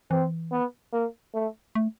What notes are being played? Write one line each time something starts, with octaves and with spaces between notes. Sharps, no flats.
E3 C4
B3
A#3
A3
A3